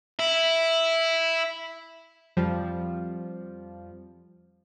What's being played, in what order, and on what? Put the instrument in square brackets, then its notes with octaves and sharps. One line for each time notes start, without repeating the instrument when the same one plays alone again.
[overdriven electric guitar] E4
[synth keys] F2 F3 G3